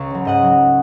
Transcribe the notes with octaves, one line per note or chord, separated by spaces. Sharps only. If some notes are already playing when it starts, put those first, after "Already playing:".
Already playing: C#2 A#5 C#6
C#3 F#3
G#2 D#5 F#5
F#3